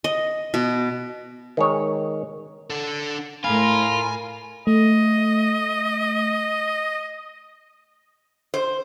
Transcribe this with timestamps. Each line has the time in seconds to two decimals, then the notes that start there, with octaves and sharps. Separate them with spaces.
0.04 D#5
0.54 B2
1.57 D#3 G#3 C#5
2.70 D4 A4
3.44 A2 F4 A#4 G#5 B5
4.67 A3 D#5
8.54 C5